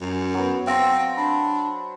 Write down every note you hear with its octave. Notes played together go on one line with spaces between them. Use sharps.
F#2
F#3 B3
C4 C5 F5 F#5 E6 A#6
D4 B5